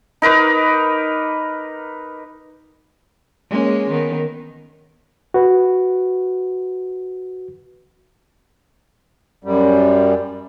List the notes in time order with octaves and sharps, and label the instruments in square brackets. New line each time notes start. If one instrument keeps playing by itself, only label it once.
[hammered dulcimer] D#4 A#4 B4 D6
[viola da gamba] G#3 A#3 C#4
D#3 B3
[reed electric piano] F#4 B4
[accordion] F#2 G3